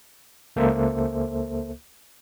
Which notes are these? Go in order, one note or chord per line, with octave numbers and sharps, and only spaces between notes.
C#2 A#3 A4 C5 E5